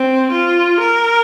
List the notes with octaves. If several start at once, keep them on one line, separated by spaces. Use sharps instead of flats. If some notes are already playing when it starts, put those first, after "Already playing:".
Already playing: C4
F4
A#4